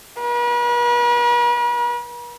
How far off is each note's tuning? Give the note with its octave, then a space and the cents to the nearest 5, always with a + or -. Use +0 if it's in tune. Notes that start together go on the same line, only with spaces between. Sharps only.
B4 -45